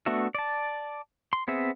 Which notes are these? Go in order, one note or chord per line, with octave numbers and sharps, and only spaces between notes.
A3 B3 D4 F#4 E5
D5 A5
C6
B3 C4 G#4 E5